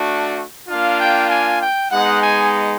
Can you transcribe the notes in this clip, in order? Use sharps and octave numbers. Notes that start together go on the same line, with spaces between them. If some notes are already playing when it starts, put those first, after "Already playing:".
Already playing: A3 D4 F#4
A#3 D4 F4 F5
G5
G#5
G5
G#3 B3 D#4 F#5
G#5